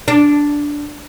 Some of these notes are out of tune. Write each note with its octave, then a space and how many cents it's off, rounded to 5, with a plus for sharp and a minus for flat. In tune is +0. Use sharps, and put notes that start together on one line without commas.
D4 -5